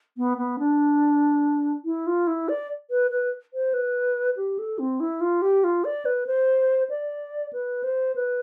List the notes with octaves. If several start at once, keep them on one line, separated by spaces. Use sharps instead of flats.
B3
B3
D4
E4
F4
E4
D5
B4
B4
C5
B4
G4
A4
C4
E4
F4
G4
F4
D5
B4
C5
D5
B4
C5
B4